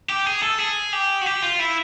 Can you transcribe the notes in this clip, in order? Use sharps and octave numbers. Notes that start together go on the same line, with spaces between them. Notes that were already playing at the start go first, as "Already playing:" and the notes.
G4
G#4
A4
G#4
G4
F#4
G4
F4
E4